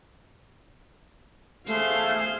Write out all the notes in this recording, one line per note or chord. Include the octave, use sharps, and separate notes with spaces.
A3 G#4 C5 F5 C7